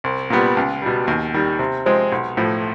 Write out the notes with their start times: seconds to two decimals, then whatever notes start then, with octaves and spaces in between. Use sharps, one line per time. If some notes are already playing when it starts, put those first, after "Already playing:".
0.04 C2
0.30 A#2 G3 B3
0.57 C#2
0.82 B2 G3
1.07 D#2
1.34 D#3 G3
1.59 C3
1.86 F3 G#3 C4
2.12 B1
2.37 A2 F3